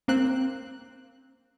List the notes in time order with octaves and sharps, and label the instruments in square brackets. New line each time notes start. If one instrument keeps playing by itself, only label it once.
[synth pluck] A#3 C4 F#6